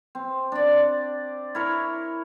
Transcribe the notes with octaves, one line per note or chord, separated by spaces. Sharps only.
C4
D4 D5
E4 A#4 C#5